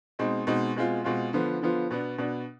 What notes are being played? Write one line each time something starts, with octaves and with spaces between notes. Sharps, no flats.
B2 G#3 C4 D#4
B2 G#3 C4 D#4
B2 G#3 C4 F4
B2 G#3 C4 F4
D3 F3 B3 F4
D3 F3 B3 F4
B2 B3 D4
B2 B3 D4